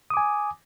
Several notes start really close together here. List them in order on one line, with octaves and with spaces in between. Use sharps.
D#6 D6 G#5